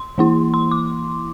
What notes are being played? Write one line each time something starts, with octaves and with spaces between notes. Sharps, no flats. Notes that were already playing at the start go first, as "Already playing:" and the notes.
Already playing: C6
E3 A#3 E4
C6
D6